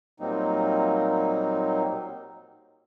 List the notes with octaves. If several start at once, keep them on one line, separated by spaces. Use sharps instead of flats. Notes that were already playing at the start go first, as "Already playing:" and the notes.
A#2 F#3 G3 A#3 C4 D#4